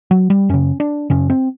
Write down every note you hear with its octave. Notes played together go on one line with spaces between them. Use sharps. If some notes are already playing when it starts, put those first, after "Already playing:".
F#3
G3
F#2 C#3 C#4
D4
F#2 C#3 C#4
C4